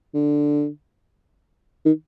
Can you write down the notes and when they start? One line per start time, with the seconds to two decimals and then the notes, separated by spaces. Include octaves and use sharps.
0.14 D3
1.85 D#3